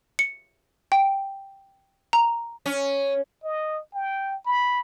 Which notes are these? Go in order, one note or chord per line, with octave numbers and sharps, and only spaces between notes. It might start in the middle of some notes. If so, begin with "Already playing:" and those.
C#7
G5
A#5
C#4
D#5
G5
B5